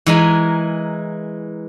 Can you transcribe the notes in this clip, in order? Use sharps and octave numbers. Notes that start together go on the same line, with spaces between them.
E3 G#3 A#4